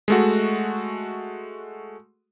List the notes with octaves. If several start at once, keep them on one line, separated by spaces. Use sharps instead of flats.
G#3 A3 F#4